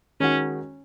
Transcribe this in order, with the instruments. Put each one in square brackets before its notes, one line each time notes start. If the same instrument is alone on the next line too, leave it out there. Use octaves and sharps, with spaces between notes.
[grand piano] D#3 G#3 D#4 F#4 [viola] C#4